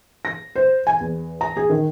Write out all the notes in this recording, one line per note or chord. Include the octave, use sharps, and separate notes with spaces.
A#6
C5
G#5
E2
A#5
G#4
D#3